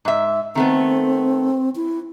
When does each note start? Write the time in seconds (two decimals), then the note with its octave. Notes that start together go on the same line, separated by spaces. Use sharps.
0.05 G#2 E5
0.55 D#3 A3 B3 C4
1.76 E4